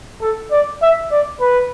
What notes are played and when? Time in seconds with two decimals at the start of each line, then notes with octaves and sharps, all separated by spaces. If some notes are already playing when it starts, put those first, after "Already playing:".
0.22 A4
0.52 D5
0.82 E5
1.12 D5
1.41 B4